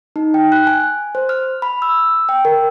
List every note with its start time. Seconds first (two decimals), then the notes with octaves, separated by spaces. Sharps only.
0.16 D#4
0.34 G5
0.52 F#6
0.67 G#5
0.81 G#5
1.15 C5
1.29 F6
1.62 B5
1.82 E6
2.29 G5
2.45 A#4